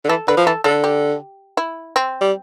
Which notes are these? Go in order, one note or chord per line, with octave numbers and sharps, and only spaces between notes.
D3
E3 A4
D3 B4
F3
E3 A4
D3 A4
G4
E4
C4
G3